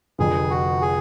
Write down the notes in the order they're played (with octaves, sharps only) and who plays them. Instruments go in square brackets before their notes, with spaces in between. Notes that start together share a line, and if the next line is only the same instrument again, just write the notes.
[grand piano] F1 F2 D3 [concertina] G#4
[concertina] F#4
G#4